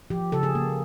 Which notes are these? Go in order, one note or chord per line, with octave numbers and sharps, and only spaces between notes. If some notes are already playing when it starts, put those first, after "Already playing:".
F3 G4
C#3 A4
G#4
A#3